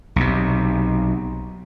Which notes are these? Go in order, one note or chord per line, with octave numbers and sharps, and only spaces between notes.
B1 C3